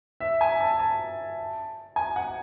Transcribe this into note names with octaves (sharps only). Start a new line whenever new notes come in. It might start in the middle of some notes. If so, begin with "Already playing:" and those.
E5
G#5
A5
A5
G#5
F#5